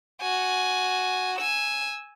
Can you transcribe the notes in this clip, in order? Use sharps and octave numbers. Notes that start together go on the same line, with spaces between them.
F#4 G#5
G#5 E6